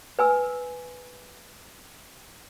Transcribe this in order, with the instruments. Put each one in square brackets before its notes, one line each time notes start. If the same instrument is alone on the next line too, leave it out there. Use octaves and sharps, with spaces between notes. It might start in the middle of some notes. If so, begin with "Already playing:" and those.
[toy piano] B4 G#5 E6